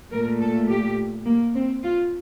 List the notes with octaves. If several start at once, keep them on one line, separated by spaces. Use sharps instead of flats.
A#2 A3 A#4
A4
G4
A#3
C4
F4